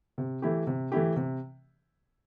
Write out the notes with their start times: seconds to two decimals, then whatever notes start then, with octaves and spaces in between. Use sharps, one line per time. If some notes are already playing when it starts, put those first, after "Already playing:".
0.18 C3
0.42 E3 A3 E4 G4
0.67 C3
0.92 E3 A3 E4 G4
1.16 C3